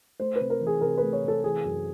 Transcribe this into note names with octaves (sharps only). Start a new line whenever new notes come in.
A3 C5
B4
C3
A#4
E3
G#4
C3 A#4
A3 B4
C#5
C3 A4
E3 G#4
F#2